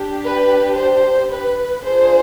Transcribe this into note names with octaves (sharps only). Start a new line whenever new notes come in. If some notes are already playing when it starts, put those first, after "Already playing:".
Already playing: D4 G4
B4
C5
B4
D4 F4 G#4 C5